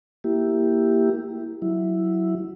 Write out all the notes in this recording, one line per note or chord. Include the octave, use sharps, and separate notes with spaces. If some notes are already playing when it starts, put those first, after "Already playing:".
A#3 E4 G4
F#3 E4